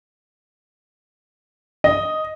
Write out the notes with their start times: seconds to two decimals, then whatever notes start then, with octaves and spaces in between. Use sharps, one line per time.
1.84 D#5